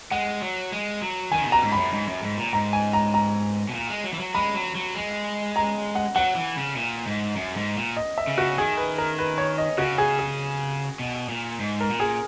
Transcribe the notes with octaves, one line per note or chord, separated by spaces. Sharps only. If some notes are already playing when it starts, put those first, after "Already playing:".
G#3 F#5
F#3
G#3
F#3
D#3 G#5
C#3
B2 A#5
G#2
F#2 B5
G#2
F#2
G#2
A#2
G#2 A#5
G#5
A#5
A#5
B2
A#2
G#3
F#3
E3
F#3
G#3 B5
F#3
F#3
G#3
A#5
F#5
F#3 F#5
E3
C#3
A#2
G#2
F#2
G#2
A#2
D#5
E5
C#3
F#4
D#3 G#4
B4
A#4
B4
C#5
D#5
C#3 F#4
G#4
G#4
B2
A#2
G#2
A#4
A#2
G#4